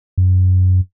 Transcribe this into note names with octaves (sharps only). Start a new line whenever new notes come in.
F#2